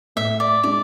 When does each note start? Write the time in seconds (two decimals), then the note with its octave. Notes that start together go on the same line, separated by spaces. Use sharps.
0.16 A2 E5
0.40 D5
0.63 G#3 D4 D5